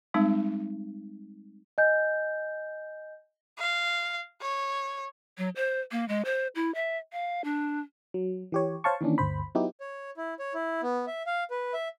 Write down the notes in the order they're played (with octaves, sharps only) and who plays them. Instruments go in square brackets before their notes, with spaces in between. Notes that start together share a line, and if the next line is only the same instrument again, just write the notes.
[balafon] G3 G#3 C4 D#4
[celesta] D#5 G#5 G6
[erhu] F5
C#5
[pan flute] F#3
C5
A#3
G#3
C5
E4
E5
F5
D4
[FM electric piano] F#3
E3 G4 C#5
C5 C#5 F5 A5 C#6
D#3 E3 A#3 C#4 D4
G1 D2 C5 B5
F#3 B3 D#4 E4 G4
[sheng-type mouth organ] C#5
E4
C#5
E4
B3
E5
F5
B4
E5